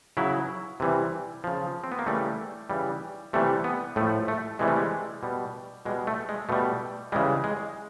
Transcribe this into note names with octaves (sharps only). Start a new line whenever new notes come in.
C#3 F#3 E4
C3 E3 G3
C#3 F3
C4
B3
A#3
C#3 E3 G3 A3
C#3 E3 G3
C3 E3 G3 A3
B3
A2 F3 A3
A3
C3 E3 G3 G#3
A3
G#3
B2 G3
B2 G3 G#3
A3
G#3
B2 G3 A3
C#3 E3 G3 G#3
G#3